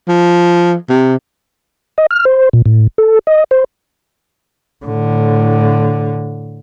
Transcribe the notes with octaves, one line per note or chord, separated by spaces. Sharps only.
F3
C3
D#5
F6
C5
A#2
A2
A4
D#5
C5
A2 D3